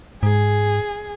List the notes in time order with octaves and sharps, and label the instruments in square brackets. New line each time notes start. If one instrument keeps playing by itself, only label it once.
[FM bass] G#2 [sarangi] G#4